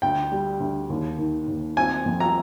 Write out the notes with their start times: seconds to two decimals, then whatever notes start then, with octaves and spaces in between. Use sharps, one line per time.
0.02 D2 G5
0.32 G3
0.60 D2
0.90 D#2
1.19 D#3
1.48 D#2
1.77 C4 G#5
2.06 F2
2.20 A#5